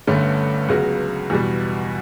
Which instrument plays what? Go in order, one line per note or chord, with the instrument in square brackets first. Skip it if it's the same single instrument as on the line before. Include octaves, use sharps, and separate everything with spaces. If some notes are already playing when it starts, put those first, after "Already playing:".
[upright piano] G1 G2 D3 A3 C#4
C#2 C#3 F#3 B3 F#4
E2 B2 G3